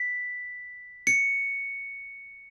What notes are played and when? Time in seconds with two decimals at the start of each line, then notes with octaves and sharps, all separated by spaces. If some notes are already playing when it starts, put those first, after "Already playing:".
Already playing: B6
1.07 C#7